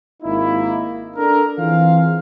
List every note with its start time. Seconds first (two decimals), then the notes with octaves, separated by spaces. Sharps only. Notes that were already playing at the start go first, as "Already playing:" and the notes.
0.22 G#1 A#3 D#4 E4
1.16 D4 A4 A#4
1.59 E3 C4 F4 G#4 F5